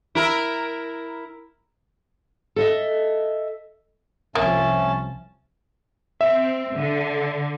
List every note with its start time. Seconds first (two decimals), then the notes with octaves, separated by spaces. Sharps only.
0.15 E4 A#4
2.56 A4 D#5 E5
4.35 C2 F3 A#3 C#4 E5 A5
6.21 C4 E5
6.76 D3